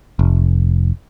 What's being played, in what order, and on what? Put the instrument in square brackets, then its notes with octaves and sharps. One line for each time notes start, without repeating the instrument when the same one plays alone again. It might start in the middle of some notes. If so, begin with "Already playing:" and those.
[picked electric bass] F1